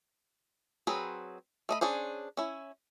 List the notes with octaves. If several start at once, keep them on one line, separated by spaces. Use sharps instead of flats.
F#3 C4 G#4 B4 B5
A3 D#5 B5
C#4 D4 G#4 C5
C#4 E4